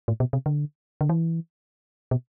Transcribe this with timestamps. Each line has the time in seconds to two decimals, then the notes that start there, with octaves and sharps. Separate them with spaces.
0.08 A2
0.20 B2
0.33 C3
0.46 D3
1.01 D3
1.09 E3
2.11 B2